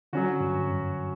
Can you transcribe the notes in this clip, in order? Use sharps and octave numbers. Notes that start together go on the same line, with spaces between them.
D3 F#3 C#4 F#4
G2
F#2